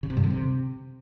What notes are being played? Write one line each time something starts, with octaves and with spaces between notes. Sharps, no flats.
C#3
C3
G2
D3
C3